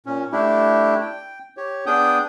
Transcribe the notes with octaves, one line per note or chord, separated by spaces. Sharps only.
A#2 C#4
A3 D4 E4 G4
G5
G4 C#5
B3 D4 G#4 G5 D#6 G6